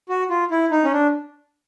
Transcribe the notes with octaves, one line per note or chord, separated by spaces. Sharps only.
F#4
F4
E4
D#4
C#4
D4